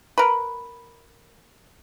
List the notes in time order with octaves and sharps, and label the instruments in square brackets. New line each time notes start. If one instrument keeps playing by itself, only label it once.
[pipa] A#4 B4